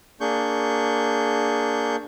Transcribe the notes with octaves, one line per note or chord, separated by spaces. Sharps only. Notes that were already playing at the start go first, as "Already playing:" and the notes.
A#3 D4 G#4 C#6 G6